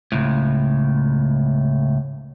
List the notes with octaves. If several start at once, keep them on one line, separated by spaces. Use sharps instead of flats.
C#2 A2